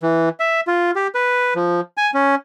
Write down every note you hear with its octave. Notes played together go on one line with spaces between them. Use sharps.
E3
E5
F4
G4
B4
F3
G#5
C#4